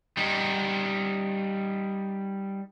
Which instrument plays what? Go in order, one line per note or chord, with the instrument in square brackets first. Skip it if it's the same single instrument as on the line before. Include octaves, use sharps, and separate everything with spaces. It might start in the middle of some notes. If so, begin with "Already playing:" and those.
[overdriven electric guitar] G3 D#4